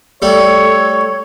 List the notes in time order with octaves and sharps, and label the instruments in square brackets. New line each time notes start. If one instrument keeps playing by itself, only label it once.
[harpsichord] G3 A3 [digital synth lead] A4 [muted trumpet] C#5